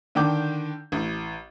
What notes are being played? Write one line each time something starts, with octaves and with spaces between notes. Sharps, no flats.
D3 D#3 D4 G5 D6 G6
A1